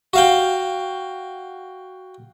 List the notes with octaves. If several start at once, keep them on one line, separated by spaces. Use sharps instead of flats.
F#4 F5 G5